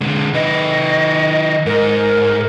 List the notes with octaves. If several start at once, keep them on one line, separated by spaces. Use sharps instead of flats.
D3 G#3
D#3 B4 D#5
G#2 A#4